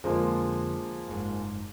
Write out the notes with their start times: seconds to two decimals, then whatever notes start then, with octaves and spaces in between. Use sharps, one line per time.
0.04 F2 D3 F3 G#3 A#3
1.08 F#1 G#2